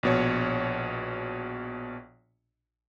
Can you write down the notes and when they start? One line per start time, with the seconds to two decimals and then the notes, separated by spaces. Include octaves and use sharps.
0.03 A#1 B2 C#5